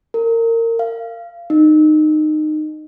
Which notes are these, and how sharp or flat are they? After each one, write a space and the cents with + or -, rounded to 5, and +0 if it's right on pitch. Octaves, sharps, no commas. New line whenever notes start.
A#4 -25
F5 -20
D#4 -20